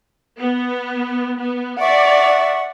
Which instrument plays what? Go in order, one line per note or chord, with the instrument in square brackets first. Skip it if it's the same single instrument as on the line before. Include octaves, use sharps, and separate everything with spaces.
[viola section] B3
B3
[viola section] D5 [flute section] E5 C#6 [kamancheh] F#5